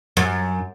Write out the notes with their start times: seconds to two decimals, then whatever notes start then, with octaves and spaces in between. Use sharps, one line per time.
0.17 F#2